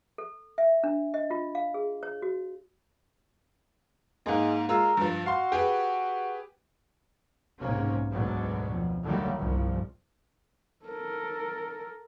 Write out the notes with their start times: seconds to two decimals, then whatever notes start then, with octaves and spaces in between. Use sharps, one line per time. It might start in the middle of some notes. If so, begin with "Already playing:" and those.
0.18 A4
0.58 E5
0.84 D4
1.14 D#5
1.30 F4
1.55 F5
1.74 G#4
2.03 C#5
2.22 F#4
4.26 G#2 G#3 A#3
4.69 G#3 F4 A#4 E6
4.97 G2 F3
5.26 F#4 F5 C6
5.52 G4 G#4 B4
7.61 B1 G#2 C3 A#3 C#4
8.12 D2 G#2 B2 D3 F#3
8.70 F2
9.04 D3 D#3 F#3 G3 A3 A#3
9.38 G1 C2 F3
10.86 A4 A#4